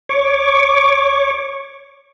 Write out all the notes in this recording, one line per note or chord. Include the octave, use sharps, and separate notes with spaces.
C#5 C#6 D6